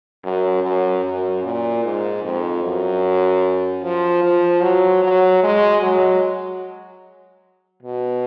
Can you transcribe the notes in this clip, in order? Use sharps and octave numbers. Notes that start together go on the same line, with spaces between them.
F#2
F#2
F#2
A#2
G#2
F2
F#2
F3
F3
F#3
F#3
G#3
F#3
B2